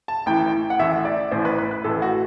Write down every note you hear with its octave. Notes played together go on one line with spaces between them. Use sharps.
A5
A1 A2 E3 G5
F#5
A1 A2 E3 E5
D5
A1 A2 E3 C5
B4
B4
B4
A1 A2 E3 A4
F#4